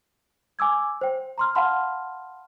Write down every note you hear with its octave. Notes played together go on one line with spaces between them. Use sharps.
G#5 D6 E6 G#6
C5 G5
A#5 C6 F6
F5 F#5 A5 B5 C6 F6